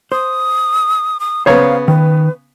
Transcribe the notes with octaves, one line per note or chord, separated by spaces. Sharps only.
C5 D#6
D#6
C#3 B3 C5 C#5 F5 A#5
D#3 B4